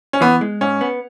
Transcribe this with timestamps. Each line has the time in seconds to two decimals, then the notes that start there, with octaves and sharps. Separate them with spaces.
0.13 C#4
0.21 E3 B3
0.41 G#3
0.61 G#2 C#4
0.81 B3